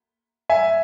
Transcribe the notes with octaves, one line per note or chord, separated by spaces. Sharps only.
E5 G#5